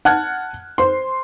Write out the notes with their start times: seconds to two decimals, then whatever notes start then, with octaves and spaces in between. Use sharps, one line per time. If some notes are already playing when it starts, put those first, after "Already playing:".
0.05 F#5 A5 F6 F#6 G#6
0.78 C5 C6